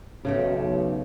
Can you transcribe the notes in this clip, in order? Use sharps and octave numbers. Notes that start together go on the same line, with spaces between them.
B1 C#3 A3 G4